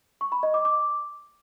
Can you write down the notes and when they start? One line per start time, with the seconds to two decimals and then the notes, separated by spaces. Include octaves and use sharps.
0.21 C#6
0.32 B5
0.43 D#5
0.54 D6
0.65 D6